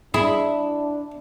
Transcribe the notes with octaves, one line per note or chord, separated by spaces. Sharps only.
D4 E4 G#4